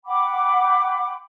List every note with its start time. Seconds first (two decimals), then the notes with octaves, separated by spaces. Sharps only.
0.05 F#5 G5 B5 D6